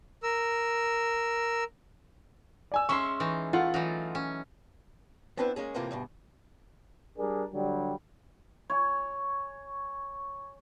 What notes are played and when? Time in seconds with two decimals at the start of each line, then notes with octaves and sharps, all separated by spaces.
0.23 A#4 E6
2.72 D5 G#5 E6
2.89 G#3 C#4 E5 C6 C#6
3.20 E3 D#4
3.53 A3 F4 F5 F#5
3.74 E3 F#3 D#4
4.15 C#4
5.37 B3 C4 D4 E4 B4 C5
5.56 G#3 A#3 C#4 G#4
5.74 F2 A2 C3 E3 A#3 F4
5.91 D2 G2 B2
7.18 G3 D4 G#4 A#4
7.52 D3 F#3 G3
8.70 C#5 G#5